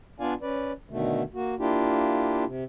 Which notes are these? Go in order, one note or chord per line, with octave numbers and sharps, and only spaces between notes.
B3 D4 F4 D5 F5 G#5
C#4 B4 D5
B2 D3 D#3 A3
A#3 F#4
A#3 D4 E4 F4 G4
C3